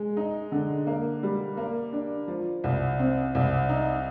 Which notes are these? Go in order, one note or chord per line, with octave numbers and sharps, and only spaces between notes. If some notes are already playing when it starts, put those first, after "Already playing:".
Already playing: G#3
D#4
D3
A#3
G3
A#3
D4
F3
C2
C4
C2
D#4